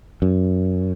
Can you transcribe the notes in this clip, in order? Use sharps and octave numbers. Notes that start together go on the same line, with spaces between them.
F#2